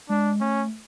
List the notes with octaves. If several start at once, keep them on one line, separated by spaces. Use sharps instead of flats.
G#3 D4
A3 C#4